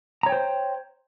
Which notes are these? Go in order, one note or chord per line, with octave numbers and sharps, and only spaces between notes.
C5 C#5 G5 A#5